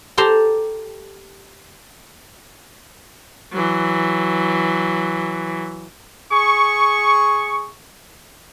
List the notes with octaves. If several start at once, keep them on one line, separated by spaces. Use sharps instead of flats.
G4 A4 C5 A5 A#5 C6
E3 F#3
G#4 C#6